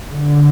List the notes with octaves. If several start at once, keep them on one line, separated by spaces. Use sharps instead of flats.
D3